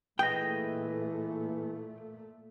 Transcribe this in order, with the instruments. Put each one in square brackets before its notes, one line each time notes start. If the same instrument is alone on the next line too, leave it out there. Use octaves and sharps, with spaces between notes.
[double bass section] A#2 A3 [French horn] E3 [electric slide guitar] G#4 B4 D#5 [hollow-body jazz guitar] G5